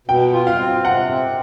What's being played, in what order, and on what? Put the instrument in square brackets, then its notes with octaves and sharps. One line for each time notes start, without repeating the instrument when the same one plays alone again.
[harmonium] B2 [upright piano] G5
[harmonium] F4
[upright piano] F5
[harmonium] C4
[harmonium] C3 [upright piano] F#5
[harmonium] C4